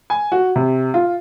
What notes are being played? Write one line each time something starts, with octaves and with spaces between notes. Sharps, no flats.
G#5
F#4
C3
F4